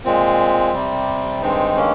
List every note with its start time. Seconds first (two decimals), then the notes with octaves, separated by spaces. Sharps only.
0.05 A#2 G#3 C4
0.73 C3 G3
1.42 G2 D#3 G#3 C4 D#4
1.76 A#3 C#4